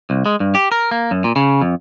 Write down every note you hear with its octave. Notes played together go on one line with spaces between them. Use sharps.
C2
G#3
G2
G4
A#4
A#3
F#2
A#2
C#3
F2